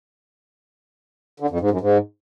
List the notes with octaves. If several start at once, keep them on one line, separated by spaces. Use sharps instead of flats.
D3
F2
G#2
F#2
G#2